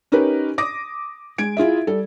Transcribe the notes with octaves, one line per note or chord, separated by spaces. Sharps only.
C#4 D#4 G4 A#4 B4
D6 D#6 A#6
G#3 G#6 D7
E4 F4 G#4 E5
G3 A4